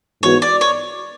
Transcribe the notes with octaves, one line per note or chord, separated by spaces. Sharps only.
G#2 E3 B3 F#4 B4 C#5
D5
C#5